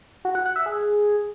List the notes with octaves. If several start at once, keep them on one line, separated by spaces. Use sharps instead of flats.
F#4
F#5
F#5
E5
G#4